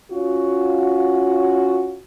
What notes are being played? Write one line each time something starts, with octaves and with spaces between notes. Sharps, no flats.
C#4 F4 F#4